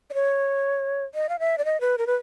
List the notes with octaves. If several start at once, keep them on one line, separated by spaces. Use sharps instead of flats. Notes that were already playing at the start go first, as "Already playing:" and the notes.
D5
C#5
D#5
F5
E5
D5
D#5
B4
A#4
B4